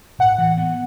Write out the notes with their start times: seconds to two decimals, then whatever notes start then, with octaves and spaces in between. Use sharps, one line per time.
0.19 A2 F#5
0.38 E3
0.57 B3